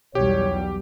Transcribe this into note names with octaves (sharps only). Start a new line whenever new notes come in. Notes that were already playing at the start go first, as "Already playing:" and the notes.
B1 E2 G3 G4 C#5